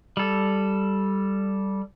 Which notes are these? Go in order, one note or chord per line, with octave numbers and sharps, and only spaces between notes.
G3 A4